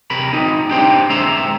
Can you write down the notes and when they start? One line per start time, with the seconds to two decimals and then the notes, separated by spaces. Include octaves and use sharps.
0.10 C3 A#4 B5
0.33 C4 D#4
0.69 D4 G4 C5 G5
1.10 G#3 C4 E5 A#5 C6